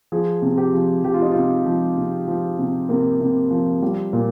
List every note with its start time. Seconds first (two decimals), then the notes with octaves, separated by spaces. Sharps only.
0.12 F3 G#4
0.42 C3
0.58 G4
0.74 F3
1.04 F3 G4
1.14 F4
1.22 D#4
1.32 C3 F4
1.66 F3
1.97 C3
2.28 F3
2.59 C3
2.89 C3 A#3
3.21 C3
3.51 F3
3.82 F3 G3
4.13 A#2